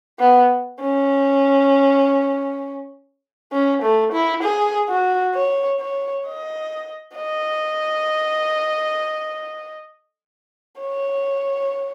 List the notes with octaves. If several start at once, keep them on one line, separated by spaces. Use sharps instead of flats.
B3
C#4
C#4
A3
E4
G#4
F#4
C#5
C#5
D#5
D#5
C#5